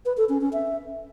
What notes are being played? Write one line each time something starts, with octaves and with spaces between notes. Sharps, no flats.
B4
A4
C#4
C#4
E5